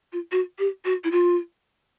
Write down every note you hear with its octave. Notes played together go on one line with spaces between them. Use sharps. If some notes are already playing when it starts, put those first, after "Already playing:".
F4
F#4
G4
F#4
E4
F4